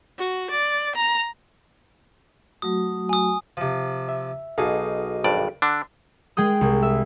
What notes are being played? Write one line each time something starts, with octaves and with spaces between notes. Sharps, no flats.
F#4
D5
A#5
F#3 A3 F#4 D#6
G#5 D#6
C3 F3
E5
B1 D#4 F#4 G#4 A4 F5
G#1 G2 D5
D3 D4
G#3 G#4 G5 D#6
C2
E5